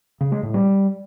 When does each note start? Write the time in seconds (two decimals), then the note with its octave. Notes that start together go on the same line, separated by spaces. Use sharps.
0.21 C#3
0.32 G#3
0.43 A2
0.54 G3